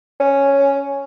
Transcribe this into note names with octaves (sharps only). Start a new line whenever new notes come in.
C#4